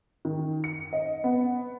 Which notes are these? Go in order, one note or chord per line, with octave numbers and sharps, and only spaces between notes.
D#3
C#7
D#5
B3